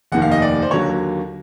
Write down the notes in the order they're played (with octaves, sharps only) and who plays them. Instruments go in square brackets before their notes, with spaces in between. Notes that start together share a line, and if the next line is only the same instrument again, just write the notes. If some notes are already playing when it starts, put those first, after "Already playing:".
[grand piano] F1 D#2 D#3 F#5
F5
D#5
D5
C5
D#2 D3 F#3 A#3 C#5